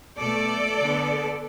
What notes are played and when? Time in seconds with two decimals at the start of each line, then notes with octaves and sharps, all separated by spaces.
0.18 B2 A3 A4 D5
0.78 D3 B3